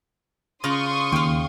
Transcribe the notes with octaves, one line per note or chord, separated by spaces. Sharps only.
C#3 F4 A#5 C6 C#6 D#6
D#2 F5 G5